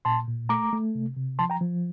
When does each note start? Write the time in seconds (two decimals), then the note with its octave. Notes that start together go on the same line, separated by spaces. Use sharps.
0.05 A#2 A5 C6
0.28 A#2
0.49 A3 A#5 D6
0.73 A3
0.95 C3
1.17 C3
1.39 F3 A5 C6
1.50 G5 A#5
1.61 F3